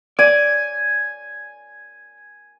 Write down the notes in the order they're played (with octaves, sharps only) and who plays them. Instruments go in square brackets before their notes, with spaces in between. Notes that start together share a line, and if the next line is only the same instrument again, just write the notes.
[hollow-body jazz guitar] D5 [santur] G#5